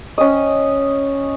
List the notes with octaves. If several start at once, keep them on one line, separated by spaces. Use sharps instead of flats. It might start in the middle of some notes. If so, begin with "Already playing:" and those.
C#4 D#5